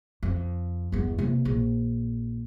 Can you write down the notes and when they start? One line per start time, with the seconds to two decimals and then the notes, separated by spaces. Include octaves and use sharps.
0.23 F2
0.92 G1 E2
1.18 C3 A#3
1.45 A#1